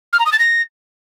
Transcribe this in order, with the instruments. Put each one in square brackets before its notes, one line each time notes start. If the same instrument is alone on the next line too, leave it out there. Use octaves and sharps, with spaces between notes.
[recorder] F6
A#5
D#6
A6
A#6